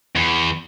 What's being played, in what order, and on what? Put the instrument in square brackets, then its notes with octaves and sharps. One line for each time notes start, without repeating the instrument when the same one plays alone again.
[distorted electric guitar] E2